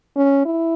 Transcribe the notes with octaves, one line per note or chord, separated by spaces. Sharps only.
C#4
E4